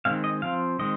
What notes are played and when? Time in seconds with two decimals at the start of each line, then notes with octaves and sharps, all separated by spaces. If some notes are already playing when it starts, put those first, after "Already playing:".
0.05 D#3 G#3 C4 F5
0.24 D#5
0.42 F3 C4 F5
0.79 D#3 G#3 C4 D#5